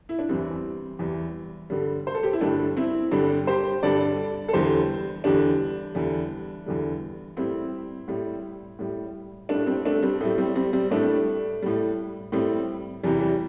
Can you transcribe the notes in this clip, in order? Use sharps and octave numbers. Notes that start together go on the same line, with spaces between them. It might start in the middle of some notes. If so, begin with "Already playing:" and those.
E4
D4
E2 E3 G3 C4
E2 E3 G3
G2 D3 G3
C5
A4
G4
E4
G2 D3 G3 A3 D4
C4 E4
G2 D3 G3 D4 G4
G4 C5
G2 D3 G3 A4 D5
A4
E2 D3 G3 G4 C5
E2 D3 G3 D4 G4
E2 D3 G3
E2 D3 G3
A2 G3 C4 E4
A2 G3
A2 G3
A2 G3 A3 D4
G3 C4
A3 D4
G3 C4
A2 G3 A3
G3 C4
G3 C4
G3 C4
A2 G3 A3 D4
A2 G3
A2 G3 C4
E2 C3 E3 G3
G3